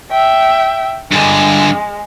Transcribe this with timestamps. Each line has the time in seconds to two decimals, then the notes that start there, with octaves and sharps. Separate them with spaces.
0.11 E5 G5
1.12 G2 D3 G#3